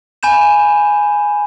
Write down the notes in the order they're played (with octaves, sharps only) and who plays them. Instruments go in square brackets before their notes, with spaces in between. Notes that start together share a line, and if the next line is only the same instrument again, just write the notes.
[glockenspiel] G#5 B5 G6 E7